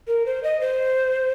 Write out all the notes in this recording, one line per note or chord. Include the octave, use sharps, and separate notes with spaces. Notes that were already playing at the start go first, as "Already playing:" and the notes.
A#4
C5
D#5
C5